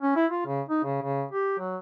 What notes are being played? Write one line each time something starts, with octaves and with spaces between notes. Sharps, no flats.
C#4
E4
F4
C#3
D#4
C#3
C#3
G4
F#3